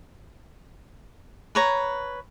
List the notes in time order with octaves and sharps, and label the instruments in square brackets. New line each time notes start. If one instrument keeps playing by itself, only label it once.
[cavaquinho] B4 C#5 A#5